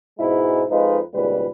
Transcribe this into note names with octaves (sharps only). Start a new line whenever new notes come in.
G#2 B2 G#3 E4
F2 G#3 D#4 F4 B4
G#1 C#2 A#2 G3 B4